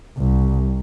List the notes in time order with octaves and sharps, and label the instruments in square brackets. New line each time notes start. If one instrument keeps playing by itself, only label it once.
[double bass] C2